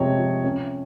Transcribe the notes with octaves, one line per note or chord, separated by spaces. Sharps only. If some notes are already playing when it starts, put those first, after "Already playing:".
Already playing: F2 C3 G#3 C#5 D#5
F3
C#4